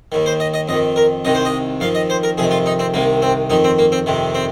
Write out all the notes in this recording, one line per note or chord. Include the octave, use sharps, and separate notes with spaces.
D#2 D#3
C5
D#5
D#5
F2 D#5
D#3
A#4
C2 C3 D#3 D#5
C5
D#5
F2 D#3 F5
D#5
C5
A#4
F2 C3 D#3 G#4
F4
D#4
C4
C2 C3 D#3 A#3
C4
F2 D#3 D#4
C4
A#3
C4
F2 C3 D#3
C4